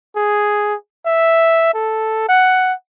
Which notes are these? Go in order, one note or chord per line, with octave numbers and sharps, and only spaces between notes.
G#4
E5
A4
F#5